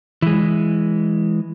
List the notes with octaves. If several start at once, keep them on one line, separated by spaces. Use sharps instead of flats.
E3 G#3